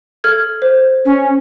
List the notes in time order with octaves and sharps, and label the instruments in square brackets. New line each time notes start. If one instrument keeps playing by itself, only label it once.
[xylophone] A4 F6 G#6
C5
[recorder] C#4